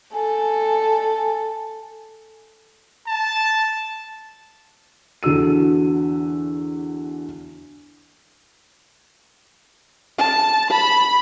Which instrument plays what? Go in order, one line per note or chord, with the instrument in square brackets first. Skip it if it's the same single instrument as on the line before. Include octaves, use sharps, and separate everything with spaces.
[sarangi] A4 [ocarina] G#5
[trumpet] A5
[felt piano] E2 D3 F#4 E6 D#7
[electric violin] A5
B5